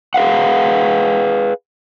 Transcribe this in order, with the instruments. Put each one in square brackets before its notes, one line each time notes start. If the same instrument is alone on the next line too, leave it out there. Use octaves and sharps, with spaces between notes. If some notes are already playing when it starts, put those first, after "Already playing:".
[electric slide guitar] G#4 B4 F5 F#5